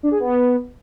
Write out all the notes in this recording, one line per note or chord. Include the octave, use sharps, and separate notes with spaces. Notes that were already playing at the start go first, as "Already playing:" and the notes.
D4
G#4
B3